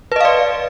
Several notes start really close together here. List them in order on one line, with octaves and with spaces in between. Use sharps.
B4 D#5 F5 D5